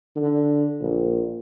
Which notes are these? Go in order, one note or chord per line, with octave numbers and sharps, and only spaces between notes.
D3
A#1